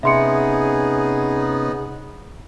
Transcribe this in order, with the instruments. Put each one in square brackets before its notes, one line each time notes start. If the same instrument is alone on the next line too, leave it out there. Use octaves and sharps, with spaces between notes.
[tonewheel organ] C3 C#4 [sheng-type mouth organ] B3 D#4 [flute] G#4 [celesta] E5 C6 C#7